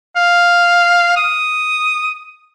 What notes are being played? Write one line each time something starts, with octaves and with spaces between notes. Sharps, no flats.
F5
D#6